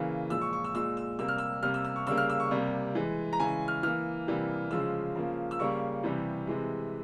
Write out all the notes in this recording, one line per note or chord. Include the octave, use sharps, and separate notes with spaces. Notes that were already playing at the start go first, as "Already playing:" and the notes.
Already playing: C#3 E3 A#3
A#2 F3 G#3 E6
C#6
C#6
E6
A#2 G#3 E6
E6
C3 G3 A#3 E6
F6
E6
C3 G3 A#3 F6
E6
E6
C#6
C#3 G3 A#3 E6
F6
E6
C#6
C3 G3 A#3
E3 G#3
A#5
C#3 E3 G#3 G#5
F6
E3 A#3 F6
C3 E3 G3 A#3
C#3 F3 G#3 E6
C#3 F3 A#3
E6
C#3 G3 A#3 C#6
C3 E3 G3
C3 E3 G#3